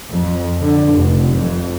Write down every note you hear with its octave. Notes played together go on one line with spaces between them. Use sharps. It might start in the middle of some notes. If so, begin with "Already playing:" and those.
F2
D3
F1
F2